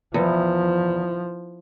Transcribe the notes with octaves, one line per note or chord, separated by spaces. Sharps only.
E2 F3